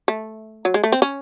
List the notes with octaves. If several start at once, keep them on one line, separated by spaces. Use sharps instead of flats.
A3
F#3
G#3
A3
C4
C#4